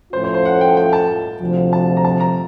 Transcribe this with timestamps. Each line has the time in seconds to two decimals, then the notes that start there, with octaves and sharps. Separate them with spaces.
0.13 A2 F3 A3 C#4 F4 C5
0.24 C5
0.34 C5
0.45 F#5
0.61 G5
0.77 G5
0.93 A5
1.40 D2 C3 F3
1.73 A5
1.97 A#5
2.04 A5
2.20 A#5